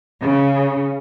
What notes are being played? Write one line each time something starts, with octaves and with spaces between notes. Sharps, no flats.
C#3